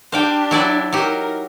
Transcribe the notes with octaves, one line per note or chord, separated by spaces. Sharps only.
D4 G4 C5 F5 G5
F#3 E4 D5
F#3 D#4 G4 A#4